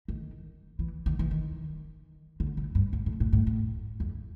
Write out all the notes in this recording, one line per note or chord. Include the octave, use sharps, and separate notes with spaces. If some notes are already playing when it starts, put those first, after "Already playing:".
D#3
E3
D#3
E3
D#3
D3
C#3
G2
G#2
A2
A2
A2
A2
F2